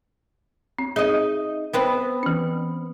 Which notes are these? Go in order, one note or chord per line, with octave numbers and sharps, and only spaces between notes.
C4
D#4 G#4 D#5
B3 C4 B4
E3 C#4